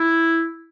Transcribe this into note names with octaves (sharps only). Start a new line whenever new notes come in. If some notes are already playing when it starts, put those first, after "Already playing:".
Already playing: E4